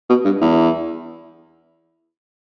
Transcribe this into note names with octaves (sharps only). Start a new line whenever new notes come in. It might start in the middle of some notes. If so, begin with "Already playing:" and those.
B2
G2
E2